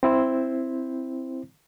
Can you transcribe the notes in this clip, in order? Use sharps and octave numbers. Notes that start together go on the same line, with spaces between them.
C4 E4 C5